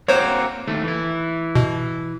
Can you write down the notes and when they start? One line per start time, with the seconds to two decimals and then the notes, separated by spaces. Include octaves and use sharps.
0.08 A#3 C4 F#4 C5 C#5
0.67 D#2 A3
0.84 E3 E4
1.55 B2